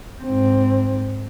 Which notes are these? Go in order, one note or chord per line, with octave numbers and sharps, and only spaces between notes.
G#2 C4